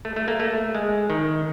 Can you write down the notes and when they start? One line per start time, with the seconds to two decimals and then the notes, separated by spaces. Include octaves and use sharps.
0.05 A3
0.16 A3
0.28 A#3
0.40 A3
0.75 G#3
1.10 D#3